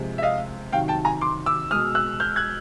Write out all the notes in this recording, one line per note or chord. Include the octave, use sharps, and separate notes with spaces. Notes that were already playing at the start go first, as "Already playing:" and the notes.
Already playing: C3 F3 G#3
E5
D#5 F5
C3 D#3 F#3 F5 G5
G5 A5
G#5 A#5
C6 D6
D6 E6
B2 G#3 D#6 F6
E6 F#6
F6 G6
F#6 G#6